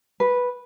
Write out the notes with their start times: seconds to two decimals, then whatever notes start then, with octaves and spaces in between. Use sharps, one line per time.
0.20 B4